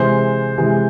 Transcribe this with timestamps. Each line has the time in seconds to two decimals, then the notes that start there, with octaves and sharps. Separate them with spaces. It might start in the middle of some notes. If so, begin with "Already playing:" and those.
Already playing: C3 E3 G#3 C5
0.58 C3 E3 G#3